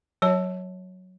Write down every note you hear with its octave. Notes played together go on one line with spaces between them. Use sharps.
F#3 C#5 A5